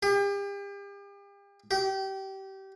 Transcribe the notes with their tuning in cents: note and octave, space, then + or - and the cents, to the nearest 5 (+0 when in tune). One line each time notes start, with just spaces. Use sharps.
G4 +40
G4 -25